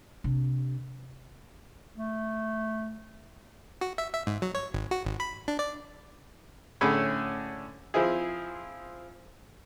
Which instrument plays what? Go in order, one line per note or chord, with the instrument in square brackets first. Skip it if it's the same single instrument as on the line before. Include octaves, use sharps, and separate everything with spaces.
[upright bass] C3 D4
[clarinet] A3
[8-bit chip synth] F#4
E5
E5
G#2
F#3
C#5
G#1
F#4
G#1
B5
D4
D5
[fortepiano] A2 D3 C#4 G#4 B5
F3 C4 E4 G#4